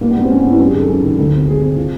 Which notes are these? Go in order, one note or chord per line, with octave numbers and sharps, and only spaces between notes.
G2 A#3
B3
G2 C4
G2 C#4
B3
G2 E4
F#2 G4
G#4
D#3
A4
F#2
D#3
D2 A4
C3
C3 G#4
C3
F3